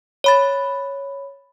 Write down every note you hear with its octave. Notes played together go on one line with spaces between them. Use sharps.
C#5 B5 A6